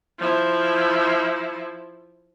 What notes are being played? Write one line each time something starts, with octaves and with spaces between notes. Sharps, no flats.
F3 E4